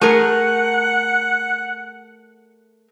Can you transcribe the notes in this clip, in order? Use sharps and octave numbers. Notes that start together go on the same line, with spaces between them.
A3 G#4 A#4 F#5